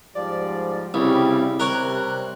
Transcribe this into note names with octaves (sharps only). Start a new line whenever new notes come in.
G#2 F3 G3 D5
C2 C#3 G3 E4 G4
C3 G3 A#4 C#5 F#6